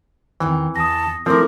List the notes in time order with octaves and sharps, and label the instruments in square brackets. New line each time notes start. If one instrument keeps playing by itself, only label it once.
[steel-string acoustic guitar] E2 D#3 C4 [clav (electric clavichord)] E3
[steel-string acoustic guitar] E2 [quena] A5 [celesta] D#6 A#6
[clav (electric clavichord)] F3 C4 [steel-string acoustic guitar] A3 C#4 E4 [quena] A#4 [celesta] C6 D6